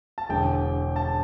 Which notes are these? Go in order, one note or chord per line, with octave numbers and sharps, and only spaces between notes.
A5
E1 E2 D3 G5
A5